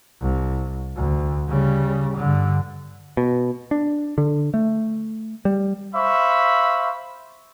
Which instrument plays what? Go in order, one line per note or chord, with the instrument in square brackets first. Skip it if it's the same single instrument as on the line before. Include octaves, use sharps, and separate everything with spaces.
[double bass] C2
D2
C#3 G3
G2 D3
[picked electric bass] B2
D4
D3
A3
G3
[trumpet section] C5 E5 F5 B5 C#6